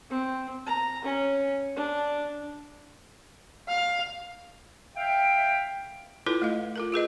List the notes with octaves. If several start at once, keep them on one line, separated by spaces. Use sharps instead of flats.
C4
A#5
C#4
D4
F5
E5 F5 G5
E4 F4 A4 B4
A3 D#5 F5
F4 A4 A#4
F4 G#4 B4 D#5